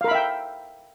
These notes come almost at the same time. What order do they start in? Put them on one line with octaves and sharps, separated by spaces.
F5 A#4 B5 E5 G5